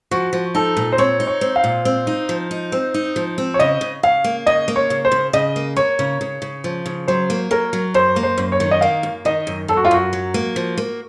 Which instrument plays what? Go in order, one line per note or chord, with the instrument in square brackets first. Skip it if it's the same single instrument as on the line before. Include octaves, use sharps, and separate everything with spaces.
[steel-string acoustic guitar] F3 [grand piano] F#4
[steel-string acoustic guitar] F3
[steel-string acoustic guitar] D#4 [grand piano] A4
[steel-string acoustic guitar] A#2
[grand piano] C5
[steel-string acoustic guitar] C4 [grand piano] C#5
[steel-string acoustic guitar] D#4
[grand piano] C#5
[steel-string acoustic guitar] C4
[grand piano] F5
[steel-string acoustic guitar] A#2
C4
D#4
F3
D#4
C4
D#4
F3
C4
[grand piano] C#5
[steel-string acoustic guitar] C#3 [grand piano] D#5
[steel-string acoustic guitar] C#3
[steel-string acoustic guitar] C#3 [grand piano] F5
[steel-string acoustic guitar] A#3
[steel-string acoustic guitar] C#3 [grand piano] D#5
[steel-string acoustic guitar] A#3
[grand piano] C#5
[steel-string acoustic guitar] C#3
[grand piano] C5
[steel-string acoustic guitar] C#3
[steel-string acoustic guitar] C#3 [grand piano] D#5
[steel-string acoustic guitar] A#3
[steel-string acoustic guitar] A#3 [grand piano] C#5
[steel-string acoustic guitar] C#3
C#3
C#3
F3
C#3
[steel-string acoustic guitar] F#3 [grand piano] C5
[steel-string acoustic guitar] A#3
[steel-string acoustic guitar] F#3 [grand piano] A#4
[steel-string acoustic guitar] F#3
[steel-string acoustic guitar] F#2 [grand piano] C5
[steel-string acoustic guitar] A#3
[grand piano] C5
[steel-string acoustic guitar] F#2
[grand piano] C#5
[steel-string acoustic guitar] D#3
[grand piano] D#5
[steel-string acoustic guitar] A#3 [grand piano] F5
[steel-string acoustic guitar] F#2
[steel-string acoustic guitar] D#3 [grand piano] D#5
[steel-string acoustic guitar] F#2
[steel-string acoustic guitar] F#2 [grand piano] A4
[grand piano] F#4
F4
[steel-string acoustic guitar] F#2 [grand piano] F#4
[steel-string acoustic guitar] F#3
A#3
F3
A#3